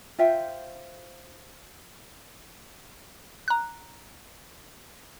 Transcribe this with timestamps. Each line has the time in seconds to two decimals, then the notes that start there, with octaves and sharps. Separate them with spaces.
0.18 F4 C5 E5 G5
3.48 A#5 F#6